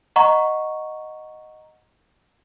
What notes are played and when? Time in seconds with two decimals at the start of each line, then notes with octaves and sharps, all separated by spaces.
0.16 D#5 F#5 A#5 C#6